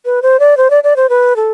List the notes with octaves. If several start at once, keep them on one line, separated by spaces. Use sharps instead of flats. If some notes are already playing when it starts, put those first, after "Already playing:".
B4
C5
D5
C5
D5
D5
C5
B4
A4